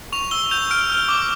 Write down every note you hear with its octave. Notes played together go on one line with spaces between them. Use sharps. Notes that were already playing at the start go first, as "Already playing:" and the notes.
C#6 F7
E6 G7
G6 F7
F6 D7
F6
D6